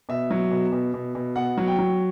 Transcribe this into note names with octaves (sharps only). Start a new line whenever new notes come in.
B2 E5
F#3
B2
B2
B2
B2
B2 F#5
F#3
G5
F#3